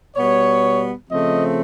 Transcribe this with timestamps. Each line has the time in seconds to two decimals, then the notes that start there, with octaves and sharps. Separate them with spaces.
0.16 B2 G3 B3 C#5
1.10 C#3 F3 A3 C4 D#5